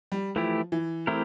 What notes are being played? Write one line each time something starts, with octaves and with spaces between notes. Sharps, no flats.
G3
E3 F3 A3 E4 G4
E3
A3 C4 E4 G4 A#4